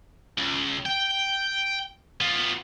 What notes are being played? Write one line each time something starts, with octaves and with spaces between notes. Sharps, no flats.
C#2
G5
B3 F4